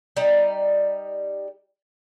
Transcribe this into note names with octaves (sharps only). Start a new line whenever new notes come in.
G3 D#4